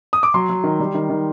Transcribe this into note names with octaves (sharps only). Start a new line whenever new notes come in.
D#6
D6
F#3 C6
F#3
D#3
G3
D#3
D#3